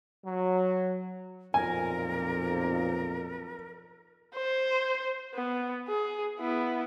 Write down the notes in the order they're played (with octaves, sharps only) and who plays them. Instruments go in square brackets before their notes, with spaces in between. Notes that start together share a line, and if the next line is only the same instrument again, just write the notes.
[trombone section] F#3
[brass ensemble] B1 F2 A#2 [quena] A#4 [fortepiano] G#5
[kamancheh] C5
B3
G#4
B3 E4